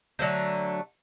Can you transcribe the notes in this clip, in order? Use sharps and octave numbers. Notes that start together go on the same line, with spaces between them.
D3 F#3 A3 C4